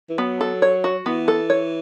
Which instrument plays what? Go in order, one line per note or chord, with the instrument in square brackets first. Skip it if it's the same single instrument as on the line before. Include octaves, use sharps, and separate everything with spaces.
[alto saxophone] E3
[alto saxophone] F#3 [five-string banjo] B3
[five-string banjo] A4
C#5
F#4
[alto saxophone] E3 [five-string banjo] B3
[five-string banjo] A4
C#5